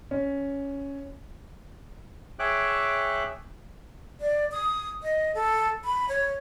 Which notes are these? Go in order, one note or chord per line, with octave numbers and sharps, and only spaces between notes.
C#4
G#4 C#5 E5 G5 D6 F#6
D5
D#6
D#5
A4
B5
C#5